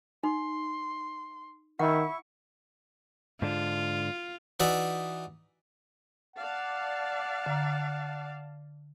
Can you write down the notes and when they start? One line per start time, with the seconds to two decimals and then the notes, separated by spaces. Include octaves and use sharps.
0.23 D#4 C6
1.79 D#3 E4 F#5 C#6
3.42 G#2 D3 D4 F4
4.60 E3 D#4 F#4 D5 E5
6.36 D5 F5 F#5 A5
7.46 D3 A#5